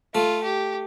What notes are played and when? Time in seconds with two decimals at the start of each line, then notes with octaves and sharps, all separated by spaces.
0.15 A3 F4
0.43 G4